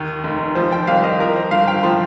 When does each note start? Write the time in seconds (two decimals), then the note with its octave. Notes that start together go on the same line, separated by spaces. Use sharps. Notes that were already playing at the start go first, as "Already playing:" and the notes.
Already playing: D#2 D#3
0.24 F1
0.55 F3 C5
0.72 G5
0.87 C2 F5
1.04 D#5
1.20 F3 A#4
1.36 C5
1.51 G1 F5
1.68 G5
1.83 F3 C6